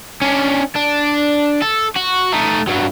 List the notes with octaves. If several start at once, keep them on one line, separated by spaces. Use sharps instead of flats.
C#4 D4
D4
A4
F#4
A3 D#4
G2 F#3